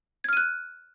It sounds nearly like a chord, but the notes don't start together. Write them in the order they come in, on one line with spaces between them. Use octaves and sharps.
G#6 F6 D#7 F#6